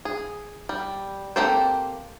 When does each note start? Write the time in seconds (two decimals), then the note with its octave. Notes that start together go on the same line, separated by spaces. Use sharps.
0.05 G#4
0.69 G3
1.36 A#3 C4 G4 A4 C5